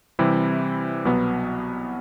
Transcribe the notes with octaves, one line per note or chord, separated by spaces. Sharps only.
C3 E3 G3 C4 E4
C2 B2 F#3 B3